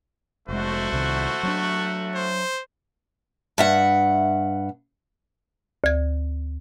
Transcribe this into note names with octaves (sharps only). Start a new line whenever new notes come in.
F1 G#3 A3 F#4 C5
C2 C3 D#3
F#3 C4 D4
C5
G2 E5 F#5
D2 G#6